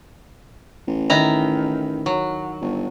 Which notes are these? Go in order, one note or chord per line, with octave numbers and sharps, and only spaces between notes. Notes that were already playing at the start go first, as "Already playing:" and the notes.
A1
D#3 E4 A#5
F#3
G1